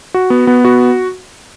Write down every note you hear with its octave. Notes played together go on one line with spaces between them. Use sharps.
F#4
B3
B3
F#4